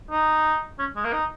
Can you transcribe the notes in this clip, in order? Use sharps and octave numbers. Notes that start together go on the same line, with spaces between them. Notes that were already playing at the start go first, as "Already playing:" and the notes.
D#4
C#4
G#3
A#3
D#4